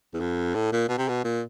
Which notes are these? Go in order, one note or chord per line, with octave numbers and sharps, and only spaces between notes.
E2
F2
A2
A#2
B2
C3
B2
A#2